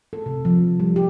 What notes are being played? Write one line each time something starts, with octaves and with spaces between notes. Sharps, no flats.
A4
C3
F3
G3
G4